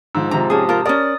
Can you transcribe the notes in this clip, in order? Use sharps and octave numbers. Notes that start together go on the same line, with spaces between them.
G#2 F3 E6
G#2 C3 F3 A#5
C#4 G4 G#4 A5 D#6
F4 A#4
C#4 A#4 D5 D#6 A6